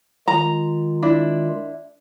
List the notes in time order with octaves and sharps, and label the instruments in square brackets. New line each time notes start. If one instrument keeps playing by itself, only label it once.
[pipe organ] D#3 G#3 F4 [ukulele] A#5
[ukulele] D4 E4